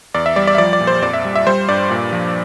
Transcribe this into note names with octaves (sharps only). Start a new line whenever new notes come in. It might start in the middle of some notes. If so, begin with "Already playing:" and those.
E2 D5
E5
G3 D5
D5
E5
F3 D5
D5
A#2
C5
F2 D5
E5
G3
E5
G3 C5
G2 D5
A#2
F3